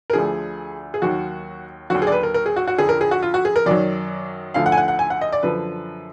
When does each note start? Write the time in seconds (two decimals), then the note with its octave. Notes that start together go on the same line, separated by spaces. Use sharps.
0.10 A#4
0.13 D2 D3 F3 G#4
0.94 G#4
1.02 D#2 D#3 F#3 F#4
1.90 D#2 D3 F#3 F#4
2.02 G#4
2.07 D5
2.12 B4
2.23 A#4
2.34 A#4
2.46 G#4
2.56 F#4
2.67 F#4
2.78 F2 D3 F3 G#4
2.89 A#4
3.01 G#4
3.11 F#4
3.22 F4
3.34 F#4
3.45 G#4
3.56 A#4
3.66 F#2 D#3 F#3 D5
4.54 D2 D3 F3 F5
4.66 F#5
4.72 G#5
4.77 F#5
4.88 F#5
4.99 G#5
5.10 F#5
5.21 D#5
5.32 D5
5.43 F#2 D3 F3 B4